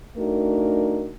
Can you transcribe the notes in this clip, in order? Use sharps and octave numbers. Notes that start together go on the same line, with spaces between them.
A3 D4 D#4 F#4 A#4